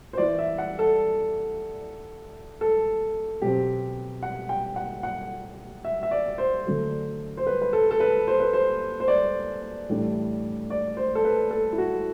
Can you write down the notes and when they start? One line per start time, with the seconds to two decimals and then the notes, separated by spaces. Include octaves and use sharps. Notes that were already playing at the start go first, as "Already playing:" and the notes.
0.13 C5
0.18 E3 B3 E4 D5
0.38 E5
0.58 F#5
0.79 A4
2.61 A4
3.42 B2 F#3 C4 G4
4.23 F#5
4.49 G5
4.76 F#5
5.03 F#5
5.85 E5
6.03 E5
6.11 D5
6.38 C5
6.66 D3 F#3 A3
7.37 C5
7.47 B4
7.62 B4
7.73 A4
7.91 A4
8.00 B4
8.28 C5
8.40 B4
8.53 C5
9.00 C5
9.08 D5
9.89 A2 E3 G3 D4
10.70 D5
10.97 C5
11.15 A4
11.25 B4
11.51 A4
11.73 E4
11.78 F#4